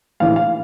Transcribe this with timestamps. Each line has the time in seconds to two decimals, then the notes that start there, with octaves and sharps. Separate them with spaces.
0.20 A#1 A2 E3 F5
0.36 F5